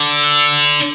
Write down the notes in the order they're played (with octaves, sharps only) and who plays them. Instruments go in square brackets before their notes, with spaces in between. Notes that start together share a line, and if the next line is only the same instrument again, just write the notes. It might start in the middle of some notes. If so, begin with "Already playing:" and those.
Already playing: [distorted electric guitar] D3